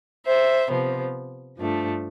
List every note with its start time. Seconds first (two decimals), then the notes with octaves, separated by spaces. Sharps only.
0.26 C5 E5
0.70 C3 F3 B3
1.57 G2 F3 A3 D4